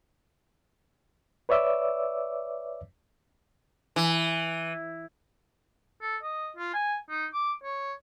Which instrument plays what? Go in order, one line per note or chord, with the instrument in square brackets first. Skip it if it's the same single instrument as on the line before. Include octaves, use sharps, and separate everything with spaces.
[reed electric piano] B4 C#5 D5 E5 D6 E6
[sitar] E3
[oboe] A4
D#5
F4
G#5
D#4
D6
C#5